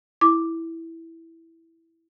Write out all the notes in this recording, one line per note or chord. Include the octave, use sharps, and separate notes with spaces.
E4 D6